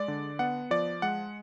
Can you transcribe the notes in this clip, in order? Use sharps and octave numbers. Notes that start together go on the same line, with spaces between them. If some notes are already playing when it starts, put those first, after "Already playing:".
Already playing: G#3 D5
D3
B3 F#5
F3 D5
G#3 F#5